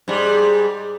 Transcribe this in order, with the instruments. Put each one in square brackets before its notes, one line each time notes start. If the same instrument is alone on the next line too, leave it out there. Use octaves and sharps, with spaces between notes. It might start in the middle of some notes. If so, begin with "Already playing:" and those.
[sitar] G#2 G3